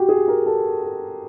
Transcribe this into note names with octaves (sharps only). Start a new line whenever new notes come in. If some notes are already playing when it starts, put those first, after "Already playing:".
Already playing: F#4 G4
G#4
A#4
A4
A4